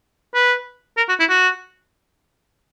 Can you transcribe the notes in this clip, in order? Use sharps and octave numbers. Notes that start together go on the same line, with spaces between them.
B4
A#4
F#4
E4
F#4